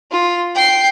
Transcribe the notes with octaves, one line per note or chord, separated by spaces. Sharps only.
F4
G5 C7